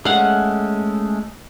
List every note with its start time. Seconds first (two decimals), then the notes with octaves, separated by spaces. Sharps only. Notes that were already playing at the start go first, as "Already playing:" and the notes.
0.05 G#3 A3 C#4 F5 F#5